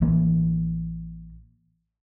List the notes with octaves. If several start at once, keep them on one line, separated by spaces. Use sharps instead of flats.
A1 E3 A#3